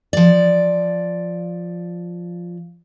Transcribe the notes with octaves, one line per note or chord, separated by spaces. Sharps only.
F3 D5